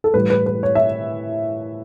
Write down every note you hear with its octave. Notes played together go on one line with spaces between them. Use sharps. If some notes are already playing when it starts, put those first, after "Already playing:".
A4
A2 E3 G3 B4
B4
B4
C#5
E5